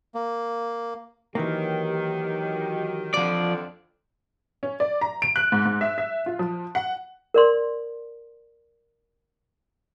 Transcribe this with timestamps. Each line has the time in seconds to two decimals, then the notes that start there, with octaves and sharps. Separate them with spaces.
0.15 A#3
1.35 D#3 E3 F#3 A#3 G4
3.14 F2 D3 F3 D5
4.63 C#4
4.80 D5
5.01 A#5
5.22 D7
5.36 F#6
5.52 G#2
5.65 G#2
5.81 E5
5.98 E5
6.26 F4
6.39 F3
6.75 F#5
7.34 A#4 D5 C6